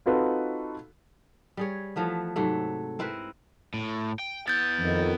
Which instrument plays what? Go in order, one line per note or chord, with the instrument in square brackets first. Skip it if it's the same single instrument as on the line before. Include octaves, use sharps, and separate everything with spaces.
[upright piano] C4 D#4 F4 F#4 A4 B4
[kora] G3 G#4 C#5
E3 F3 A3 B3
G#2 C3 F#3 A3
C4 E4 A#4 B4
[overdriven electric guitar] A2
G5
[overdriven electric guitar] B3 E4 [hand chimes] G6 A6
[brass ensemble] F2 D#3